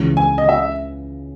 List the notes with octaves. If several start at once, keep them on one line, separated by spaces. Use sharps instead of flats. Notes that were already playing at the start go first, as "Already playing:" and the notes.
Already playing: C#2 C#3 E3
G#5
D#5
E5